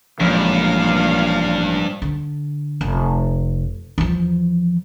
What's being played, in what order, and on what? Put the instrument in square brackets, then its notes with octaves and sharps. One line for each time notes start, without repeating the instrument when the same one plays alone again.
[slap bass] A1 [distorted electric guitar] G2 [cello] A#2 F5 [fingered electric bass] F3 G#3
[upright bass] D3
F1
E2 F3